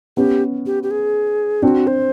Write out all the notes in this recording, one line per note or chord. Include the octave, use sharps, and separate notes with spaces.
B3 C#4 G4
G4
G4
G#4
C4 D4 F#4
C5